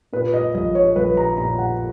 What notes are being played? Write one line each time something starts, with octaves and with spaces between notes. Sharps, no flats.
A#2 B4
D#5
A#1 D#5
C#5
A#1 B4
A#5
A#2 A#5
F#5